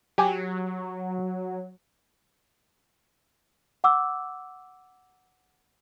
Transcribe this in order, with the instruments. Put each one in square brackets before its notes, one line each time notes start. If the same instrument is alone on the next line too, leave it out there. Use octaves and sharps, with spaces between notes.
[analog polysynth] F#3 [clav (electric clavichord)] G4 G#5
[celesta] F#5 D6 E6